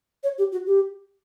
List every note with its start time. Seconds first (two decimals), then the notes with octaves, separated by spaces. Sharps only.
0.23 C#5
0.38 G4
0.52 F#4
0.67 G4